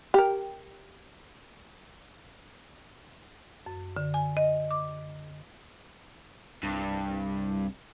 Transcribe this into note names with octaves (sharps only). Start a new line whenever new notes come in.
G4 A#4
F#2
D3
G#5
D#5
D6
C2 G2